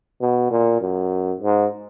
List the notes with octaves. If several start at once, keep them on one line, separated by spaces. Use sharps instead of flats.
B2
A#2
F#2
G#2